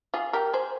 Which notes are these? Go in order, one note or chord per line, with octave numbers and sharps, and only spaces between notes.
F4 G#4
G4 A#4
G#4 C5